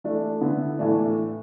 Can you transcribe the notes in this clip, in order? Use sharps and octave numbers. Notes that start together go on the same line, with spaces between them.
E3 A3 D4
D3 B3 E4
A2 E3 A3 D4